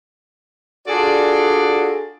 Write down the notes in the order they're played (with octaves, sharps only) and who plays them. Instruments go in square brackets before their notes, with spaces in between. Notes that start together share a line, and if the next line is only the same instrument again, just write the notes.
[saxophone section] D4 F4 F#4 G#4 A4 D5